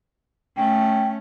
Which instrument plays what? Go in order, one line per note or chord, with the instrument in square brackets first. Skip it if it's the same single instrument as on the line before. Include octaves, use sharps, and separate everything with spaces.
[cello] A3 C#4 [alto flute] G5